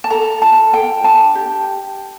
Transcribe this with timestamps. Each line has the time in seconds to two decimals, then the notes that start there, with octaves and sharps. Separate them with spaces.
0.04 A5
0.10 A4 A#5
0.42 F4 A5
0.73 A4 G5
1.04 D4 A5
1.35 G4